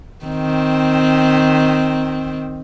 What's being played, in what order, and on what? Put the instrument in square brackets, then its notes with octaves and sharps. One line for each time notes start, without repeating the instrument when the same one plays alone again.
[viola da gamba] D#3 C4